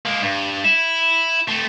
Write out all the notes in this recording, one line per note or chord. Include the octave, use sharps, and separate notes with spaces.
G#3 A#3
G2
E4
A3 C4